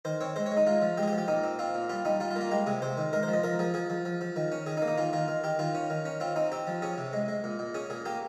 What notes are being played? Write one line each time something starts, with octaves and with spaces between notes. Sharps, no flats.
D#3 C5
C4 C#5
G#3 C5
C#5
G#3
D#4
G#3 F4
F3
G#3 G4
G#4
G4
F3
G4
A#2 D#4
C4
C4 F4
A#2
G3 F4
G3 D#4
G3 F4
F4
A#3
F4
G#3 G4
C3 G#4
C3 C5
D#3
G#3 A#4
C5
F3
D#5
F3 A#4
F3 G#4
F3 G#4
F3
F3
F3
D#3
C#4
D#3 G#4
D#4
A#3
D#4
D#3 F4
D#3 F4
D#3
D#3 G4
D#3 F4
C#4
D#3
C#4
C4 F4
C4 D#4
C4 G4
F3
C#4 G#4
C3
G#3
G#3
A#2
A#2
C#4 G#4
A#2 G#4
A#3 G4